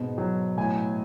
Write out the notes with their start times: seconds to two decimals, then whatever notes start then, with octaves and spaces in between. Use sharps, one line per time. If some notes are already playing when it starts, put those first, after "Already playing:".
Already playing: G#2 B2
0.18 F#3
0.57 A2 G#5